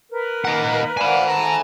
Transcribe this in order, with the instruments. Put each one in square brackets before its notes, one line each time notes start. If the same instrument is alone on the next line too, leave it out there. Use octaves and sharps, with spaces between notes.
[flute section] A#4 B4
[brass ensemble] D#3 A#3 [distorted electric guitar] D#5 F#5
[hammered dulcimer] F#4 C5 [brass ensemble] D5 F5 [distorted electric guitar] G#5 B5
[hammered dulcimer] D#3 G#3 A3 [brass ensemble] A5 A#5